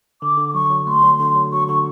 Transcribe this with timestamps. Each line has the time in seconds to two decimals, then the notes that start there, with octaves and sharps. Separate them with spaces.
0.22 D3 D6
0.37 D3
0.49 D6
0.54 F#3 C#6
0.70 F#3
0.87 A3 C6
1.03 F#3
1.19 D3 C6
1.35 F#3
1.53 F#3 C#6
1.68 D3 C#6